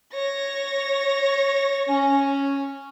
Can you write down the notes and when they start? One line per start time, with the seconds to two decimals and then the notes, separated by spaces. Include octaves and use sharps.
0.14 C#5 A#6
1.88 C#4